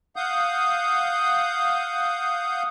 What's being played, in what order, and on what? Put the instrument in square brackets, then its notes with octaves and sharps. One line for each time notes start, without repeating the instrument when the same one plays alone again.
[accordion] F5 F#5 D#6 G6